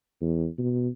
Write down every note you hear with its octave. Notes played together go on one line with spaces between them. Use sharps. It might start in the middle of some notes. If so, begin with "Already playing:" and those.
E2
B2